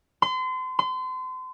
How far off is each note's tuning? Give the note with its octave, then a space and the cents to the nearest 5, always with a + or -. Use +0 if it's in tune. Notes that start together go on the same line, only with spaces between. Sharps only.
C6 -35
C6 -35